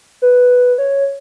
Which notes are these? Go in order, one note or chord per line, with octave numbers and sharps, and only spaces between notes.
B4
C#5